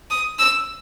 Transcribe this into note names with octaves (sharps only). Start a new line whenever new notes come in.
D#6
E6